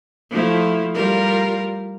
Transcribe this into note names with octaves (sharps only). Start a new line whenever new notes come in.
F3 A3 E4
G3 F4 A#4